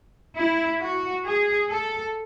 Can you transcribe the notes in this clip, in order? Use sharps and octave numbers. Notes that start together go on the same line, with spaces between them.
E4
F#4
G#4
A4